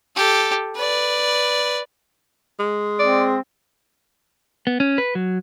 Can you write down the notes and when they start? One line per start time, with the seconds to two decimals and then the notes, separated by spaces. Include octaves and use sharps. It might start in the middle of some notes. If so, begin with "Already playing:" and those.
0.16 G4 A4
0.76 B4 D5
2.60 G#3
2.99 C4 D5
4.67 B3
4.80 C#4
4.98 B4
5.15 F#3